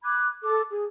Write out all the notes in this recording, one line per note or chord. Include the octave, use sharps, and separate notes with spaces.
B5 D6 F#6 G#6
A4 D6
G#4